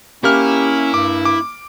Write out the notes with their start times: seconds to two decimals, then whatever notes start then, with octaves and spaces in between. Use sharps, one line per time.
0.24 A#3 C#4 E4 G4 F6
0.94 G2 D6
1.25 D6